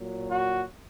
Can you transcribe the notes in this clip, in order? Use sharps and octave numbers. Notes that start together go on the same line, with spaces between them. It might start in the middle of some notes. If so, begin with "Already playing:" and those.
Already playing: A#2 F#3
F#4